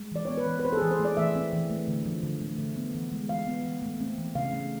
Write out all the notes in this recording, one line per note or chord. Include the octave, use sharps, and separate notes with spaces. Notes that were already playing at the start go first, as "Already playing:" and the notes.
Already playing: G#3
E3 D5
B3 C#5
B4
E3
B4
C4 C5
A4
E3 G#4
C5
A3
D5
E3 E5
C4
E3
A3
D3
F3
D3
A3
D3
B3
E3
G#3
E3 F5
B3
E3
A3
C4
E3
C#3 F5
A3